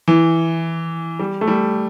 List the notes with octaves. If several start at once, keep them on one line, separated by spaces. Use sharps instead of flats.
E3
G3
A3
G3